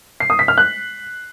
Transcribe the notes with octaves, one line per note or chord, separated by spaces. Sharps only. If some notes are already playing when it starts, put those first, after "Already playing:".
C7
D#6
B6
F6
F#6